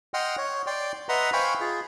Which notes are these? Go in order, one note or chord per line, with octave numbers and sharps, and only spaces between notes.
D#5 F#5 G5 C6 F6
C#5
D5 G5 C6
B4 D#5 E5 F#5 A#5 C6
C5 F5 G5 G#5 B5 C#6
F4 G#4